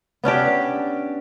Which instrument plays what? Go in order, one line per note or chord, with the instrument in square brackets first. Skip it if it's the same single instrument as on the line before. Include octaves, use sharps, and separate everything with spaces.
[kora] B3 C#4 D4 G4